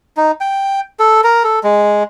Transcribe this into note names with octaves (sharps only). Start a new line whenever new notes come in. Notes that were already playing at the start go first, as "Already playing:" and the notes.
D#4
G5
A4
A#4
A4
G#3